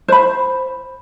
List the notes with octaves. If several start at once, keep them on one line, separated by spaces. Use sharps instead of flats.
C5 B5